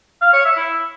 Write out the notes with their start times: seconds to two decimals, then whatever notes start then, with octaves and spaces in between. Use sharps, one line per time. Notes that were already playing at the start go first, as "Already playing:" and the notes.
0.21 F5
0.33 C#5
0.45 E5
0.57 E4